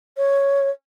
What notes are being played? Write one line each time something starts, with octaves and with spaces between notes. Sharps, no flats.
C#5